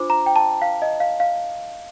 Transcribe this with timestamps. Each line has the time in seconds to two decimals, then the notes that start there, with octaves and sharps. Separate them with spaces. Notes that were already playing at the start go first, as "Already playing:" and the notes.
Already playing: D4 F4 C5 D6
0.10 A#5
0.26 G5
0.36 A5
0.62 F5
0.82 D#5
1.00 F5
1.20 F5